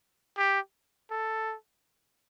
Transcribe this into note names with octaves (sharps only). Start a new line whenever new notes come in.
G4
A4